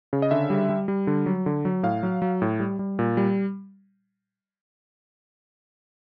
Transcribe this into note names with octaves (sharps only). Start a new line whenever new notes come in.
C#3
D#5
D3 E5
G3
G3
G3
D3
F#3
D3
F#3
A2 F5
F#3
F#3
A2
G3
G3
A#2
G3